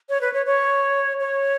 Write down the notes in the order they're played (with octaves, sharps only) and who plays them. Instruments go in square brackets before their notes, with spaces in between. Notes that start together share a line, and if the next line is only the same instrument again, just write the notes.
[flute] C#5
B4
C#5
C#5
C#5